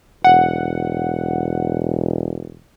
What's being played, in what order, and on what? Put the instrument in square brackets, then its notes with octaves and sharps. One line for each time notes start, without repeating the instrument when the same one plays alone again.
[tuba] E1 [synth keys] F#5